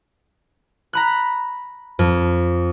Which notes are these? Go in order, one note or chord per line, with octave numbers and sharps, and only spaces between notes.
A#5 B5 F#6
F2